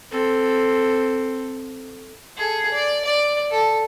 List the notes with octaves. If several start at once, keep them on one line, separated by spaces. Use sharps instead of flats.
C4 A4
G#4 A4
D5
D5
A4